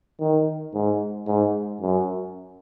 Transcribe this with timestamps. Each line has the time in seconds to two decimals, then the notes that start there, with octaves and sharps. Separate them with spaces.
0.20 D#3
0.74 G#2
1.27 G#2
1.81 F#2